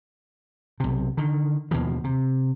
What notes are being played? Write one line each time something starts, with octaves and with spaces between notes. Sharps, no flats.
B1 C3
D3 D#3
D#2 B2 E3 F3
C3